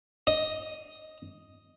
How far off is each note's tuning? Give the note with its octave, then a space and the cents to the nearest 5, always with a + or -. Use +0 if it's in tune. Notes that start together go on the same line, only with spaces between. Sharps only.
D#5 +5